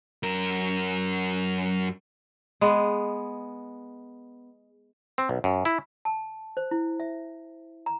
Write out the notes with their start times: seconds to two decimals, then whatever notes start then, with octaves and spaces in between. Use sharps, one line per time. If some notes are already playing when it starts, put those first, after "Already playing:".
0.23 F#2 A#4
2.61 G#3 B3
5.18 C4
5.29 B1
5.44 F#2
5.65 E4
6.05 A5
6.57 C5
6.71 E4
7.00 E5
7.86 A#5